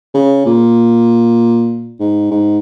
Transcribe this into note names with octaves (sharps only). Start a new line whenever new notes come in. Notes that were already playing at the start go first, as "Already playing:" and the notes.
C#3
A#2
G#2
G#2